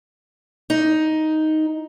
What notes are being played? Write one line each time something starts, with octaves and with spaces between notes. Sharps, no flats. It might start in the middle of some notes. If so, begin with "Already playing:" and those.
D#4